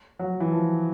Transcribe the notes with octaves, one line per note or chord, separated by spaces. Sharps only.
F#3
E3
F3